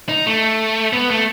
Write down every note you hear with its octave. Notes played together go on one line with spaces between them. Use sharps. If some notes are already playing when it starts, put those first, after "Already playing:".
D#4
A3
B3
A3